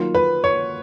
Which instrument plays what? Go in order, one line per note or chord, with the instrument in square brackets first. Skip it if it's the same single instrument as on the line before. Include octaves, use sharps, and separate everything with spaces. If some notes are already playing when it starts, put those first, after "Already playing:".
Already playing: [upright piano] D#3 F#3 A#3 F4
[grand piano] B4
C#5